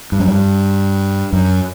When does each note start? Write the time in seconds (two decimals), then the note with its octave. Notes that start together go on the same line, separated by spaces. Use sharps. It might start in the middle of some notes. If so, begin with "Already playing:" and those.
0.12 G2
0.20 F#2
0.28 G2
1.33 F#2